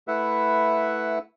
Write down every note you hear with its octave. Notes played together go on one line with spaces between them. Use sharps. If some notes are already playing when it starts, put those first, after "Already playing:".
A3 E4 B4 E5 F#5